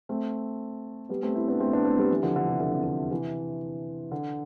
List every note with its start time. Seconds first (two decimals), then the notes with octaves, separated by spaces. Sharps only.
0.09 A3 C4
1.09 G3 B3
1.23 A3 C4
1.35 C4 E4
1.48 B3 D4
1.60 A3 C4
1.73 B3 D4
1.85 A3 C4
1.98 G3 B3
2.10 E3 G3
2.23 D3 F3
2.36 D3
2.48 C3
2.60 D3
2.72 C3
2.83 D3
3.11 C3 E3
4.12 D3